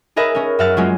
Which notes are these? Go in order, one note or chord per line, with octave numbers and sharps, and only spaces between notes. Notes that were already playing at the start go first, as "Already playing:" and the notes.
G#4 A#4 B4 D#5 E5
C#4 A#4
F#2 E5 F#5 F6 A6
F#3 G#3 A#3 C#4 F4